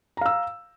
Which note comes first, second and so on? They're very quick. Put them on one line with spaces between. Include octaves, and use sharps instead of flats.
A#5 F5 E6